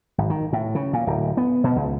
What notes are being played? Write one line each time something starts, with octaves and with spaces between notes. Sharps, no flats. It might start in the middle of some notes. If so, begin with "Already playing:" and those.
G#1
D#3
A2
C#3
A#2
D1
B3
B2
C#2